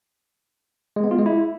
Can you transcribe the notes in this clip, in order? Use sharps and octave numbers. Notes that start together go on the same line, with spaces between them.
G#3
B3
F4
G#3
E4